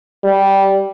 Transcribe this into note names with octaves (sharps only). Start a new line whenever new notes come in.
G3